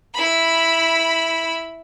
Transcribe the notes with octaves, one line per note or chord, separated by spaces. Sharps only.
E4 B5